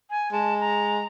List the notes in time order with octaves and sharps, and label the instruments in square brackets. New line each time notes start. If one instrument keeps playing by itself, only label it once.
[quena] G#5
[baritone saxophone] G#3 [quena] A5
[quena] A#5